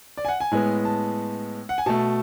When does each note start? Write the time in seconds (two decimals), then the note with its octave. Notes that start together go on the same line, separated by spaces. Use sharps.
0.17 D5
0.25 G#5
0.28 F#5
0.40 G#5
0.51 A2 G#3 B3
0.85 A5
1.69 F#5
1.78 G#5
1.86 B2 A3 A5